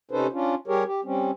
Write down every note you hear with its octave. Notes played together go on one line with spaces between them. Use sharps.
C3 C#4 D#4 A4 B4 C5
C#4 D4 F4
G3 G4 G#4 A#4 C#5
G4
G3 C4 C#4